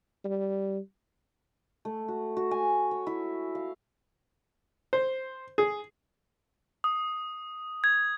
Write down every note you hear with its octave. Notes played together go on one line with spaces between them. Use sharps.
G3
A3
F#4
F#4
G#5
C#5
E4
F5
C5
G#4
D#6
G#6